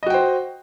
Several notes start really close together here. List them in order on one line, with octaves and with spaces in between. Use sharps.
D#5 F#4 G5 C5